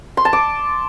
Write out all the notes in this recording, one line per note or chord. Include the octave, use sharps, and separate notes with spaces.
C6
A5
D6